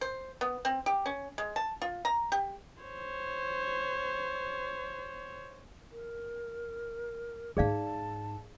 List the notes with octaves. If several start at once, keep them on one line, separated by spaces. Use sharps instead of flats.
C5
B3
C4
G4
C#4
G#3
A5
F4
A#5
G4
C5 C#5
A#4
G#2 D#4 G#4 D5 F5 A5